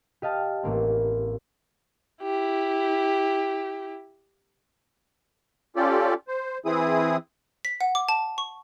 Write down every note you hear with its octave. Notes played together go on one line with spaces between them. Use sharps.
G4 D#5 F5 A5 F6
A1 A#3 C4
E4 G4
C#4 F4 G4 A4 D5
C5
E3 C4 E4 G#4 D#6
B6
F#5
D6
A5
C#6